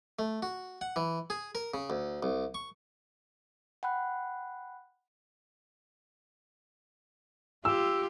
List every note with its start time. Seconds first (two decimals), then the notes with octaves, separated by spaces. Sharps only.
0.19 A3
0.42 F#4
0.81 F#5
0.96 E3
1.30 G#4
1.55 A#4
1.74 C#3
1.90 D2
2.23 C2
2.54 C#6
3.83 F#5 G5 B5 F#6
7.65 F4 G4 E6